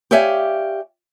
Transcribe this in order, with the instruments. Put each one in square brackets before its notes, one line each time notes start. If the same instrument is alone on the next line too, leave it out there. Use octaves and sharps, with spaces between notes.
[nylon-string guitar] G4 C#5 D5 E5 F5 G#5